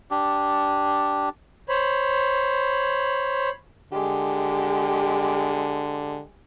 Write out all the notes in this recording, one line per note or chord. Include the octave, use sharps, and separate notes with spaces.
D4 G4
C5 C#5 B5
D3 G#3 G4